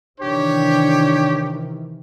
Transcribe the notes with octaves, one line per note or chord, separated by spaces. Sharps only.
C3 D#3 E3 D4 G4 C#5